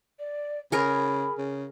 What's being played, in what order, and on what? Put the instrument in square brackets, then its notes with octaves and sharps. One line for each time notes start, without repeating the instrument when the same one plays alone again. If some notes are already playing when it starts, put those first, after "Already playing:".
[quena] D5
[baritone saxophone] C#3 [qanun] G#4 A#4 [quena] B5
[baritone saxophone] C#3